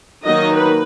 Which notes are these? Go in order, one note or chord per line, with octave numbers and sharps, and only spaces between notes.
D#3 F#3 A#3 D#4 D#5
B4